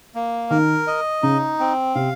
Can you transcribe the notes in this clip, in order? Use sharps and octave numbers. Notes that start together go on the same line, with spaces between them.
A#3
D#3 A#4
D#5
C#3 D#4
C4
C3 F5